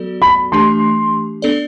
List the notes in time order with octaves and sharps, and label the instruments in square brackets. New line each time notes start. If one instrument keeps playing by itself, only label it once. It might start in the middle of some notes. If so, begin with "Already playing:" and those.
Already playing: [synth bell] F#3 B3 F#4 A4 D5
[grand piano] B5
[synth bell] E3 A3 D4 G4 [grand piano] C6
[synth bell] B3 D4 A4 D5